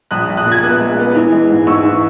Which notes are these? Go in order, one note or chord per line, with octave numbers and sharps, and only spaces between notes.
A#1 D#6 F#6
A#1
D#6 F#6
A#2
G#6
B3 D#6 F#6
G#3
B3
E3
G#3
G#2
G#2 C#6 E6
E3